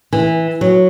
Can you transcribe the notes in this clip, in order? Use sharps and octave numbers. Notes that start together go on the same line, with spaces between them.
E3
F#3